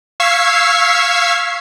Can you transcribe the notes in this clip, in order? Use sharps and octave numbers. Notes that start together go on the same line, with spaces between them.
F5 C#6 E6 G#6 B6 C7